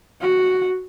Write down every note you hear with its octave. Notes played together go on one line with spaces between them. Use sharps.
F#4